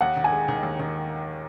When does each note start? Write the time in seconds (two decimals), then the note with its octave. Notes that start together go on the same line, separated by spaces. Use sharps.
0.01 D#2 F#5
0.16 D#3
0.24 G#5
0.32 G#3
0.48 D#3
0.63 D#2
0.79 D#3